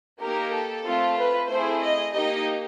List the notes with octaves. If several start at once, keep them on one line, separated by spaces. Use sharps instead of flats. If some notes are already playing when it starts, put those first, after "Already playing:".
A#3 D#4 G4 A#4
A4
A3 C4 F4
B4
A3 C4 E4 G#4 C5
D#5
A#3 D#4 G4 D#5